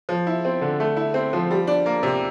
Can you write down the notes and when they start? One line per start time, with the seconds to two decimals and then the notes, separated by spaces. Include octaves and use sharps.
0.09 F3
0.27 E4
0.45 C4
0.61 D3
0.80 A3
0.97 E4
1.14 C4
1.33 F3
1.51 G3
1.67 D4
1.86 A#3
2.03 C3